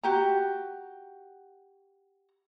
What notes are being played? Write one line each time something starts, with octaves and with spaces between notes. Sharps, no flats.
F#4 G4 A#5